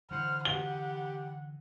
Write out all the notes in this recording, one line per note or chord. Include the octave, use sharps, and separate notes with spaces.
D3 E3 C5 F#5 F6
G4 F#5 G7